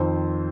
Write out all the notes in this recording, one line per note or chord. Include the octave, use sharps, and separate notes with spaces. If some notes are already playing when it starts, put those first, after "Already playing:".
Already playing: F2 D#3 C5